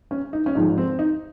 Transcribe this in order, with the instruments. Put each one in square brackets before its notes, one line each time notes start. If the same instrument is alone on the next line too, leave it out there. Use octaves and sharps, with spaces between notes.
[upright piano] C#4
D#4
C#4
G#1 G#2 F3 D#4
C4
D#4